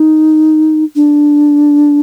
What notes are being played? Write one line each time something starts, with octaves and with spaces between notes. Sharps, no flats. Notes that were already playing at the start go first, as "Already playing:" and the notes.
Already playing: D#4
D4